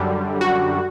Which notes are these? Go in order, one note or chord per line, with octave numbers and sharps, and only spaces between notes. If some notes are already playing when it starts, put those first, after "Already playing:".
Already playing: F#2 D3 G3
F#4